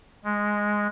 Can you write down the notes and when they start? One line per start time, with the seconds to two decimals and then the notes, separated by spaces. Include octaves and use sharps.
0.24 G#3